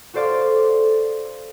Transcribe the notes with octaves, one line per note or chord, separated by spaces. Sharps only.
F#4 A4 C5 D5 F5